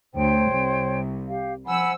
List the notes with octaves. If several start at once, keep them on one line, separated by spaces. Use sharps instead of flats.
D2 C5 C#5 G5
C2
G4 F5
F3 C5 F#5 G#5 B5 E6